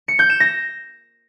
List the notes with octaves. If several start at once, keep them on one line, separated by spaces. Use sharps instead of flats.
C#7
G6
E7
A#6